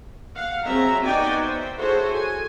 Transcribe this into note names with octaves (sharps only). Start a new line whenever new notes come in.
F5 F#5
F#3 C4 G#4 E5 A#5
B3 D#4 F#4 D5 G5 G#5
C5 E5
E4 F#4 G#4 A4 C5 C#5
G#5